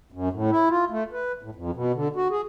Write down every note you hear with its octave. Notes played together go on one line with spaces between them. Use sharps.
F#2
A2
E4
F4
A3
B4
A2
F2
B2
D3
F#4
G#4